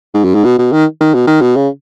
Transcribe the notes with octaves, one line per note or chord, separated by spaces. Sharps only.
G#2
F#2
G#2
B2
B2
D#3
D#3
B2
D#3
B2
C#3